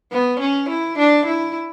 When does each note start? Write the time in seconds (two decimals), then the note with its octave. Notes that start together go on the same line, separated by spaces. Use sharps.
0.12 B3
0.40 C#4
0.69 E4
0.98 D4
1.25 E4